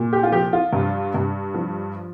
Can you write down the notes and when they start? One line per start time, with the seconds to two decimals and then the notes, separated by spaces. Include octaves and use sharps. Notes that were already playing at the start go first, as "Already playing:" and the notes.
Already playing: A#2
0.13 G4
0.23 F4
0.32 F3 G4
0.53 F4
0.73 G2
1.14 G2
1.54 F3